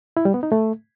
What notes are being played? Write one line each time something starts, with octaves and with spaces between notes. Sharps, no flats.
E4
G3
B3
D#4
A3